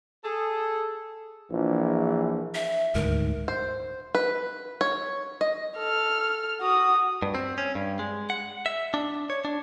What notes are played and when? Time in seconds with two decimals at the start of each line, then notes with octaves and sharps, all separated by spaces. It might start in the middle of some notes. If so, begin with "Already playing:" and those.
0.24 G#4 A4
1.51 A#1 E3
2.54 E5
2.95 D#1 D2 G#2 A#4
3.48 C5
4.15 B4
4.81 C#5
5.41 D#5
5.77 A4 F6
6.60 F#4 D#6
7.22 G2
7.35 C4
7.58 C#4
7.75 G2
7.99 G#3
8.30 F#5
8.66 E5
8.94 D4
9.30 C#5
9.45 D4